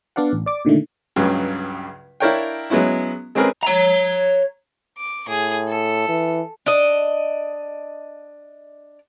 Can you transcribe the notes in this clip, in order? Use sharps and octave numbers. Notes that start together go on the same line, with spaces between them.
B3 D4 D5 F5 F#5
A1
D5 D6
A#2 D3 D#3 A3
C#2 G2 C#3 F#3
D4 E4 A#4 C#5 F5 G5
F#3 G#3 B3 C#4 E4
G#3 C4 C#4 G#4 A#4 B4
C#5 A#5
D6
A2 G#4
A4
E3
D4 D#5